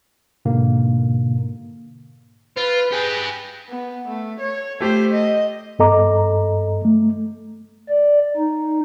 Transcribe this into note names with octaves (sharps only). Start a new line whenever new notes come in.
G#2 B2 D3 A#3
F4 B4
G4 G#4 B4
B3
A3
C#5
A3 G4 C5
D#5
G2 B3 A4 D#5 A#5 D6
A3
D5
D#4